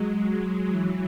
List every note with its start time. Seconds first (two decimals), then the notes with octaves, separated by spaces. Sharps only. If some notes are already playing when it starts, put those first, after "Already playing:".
Already playing: F#3 G#3
0.68 E3 F#3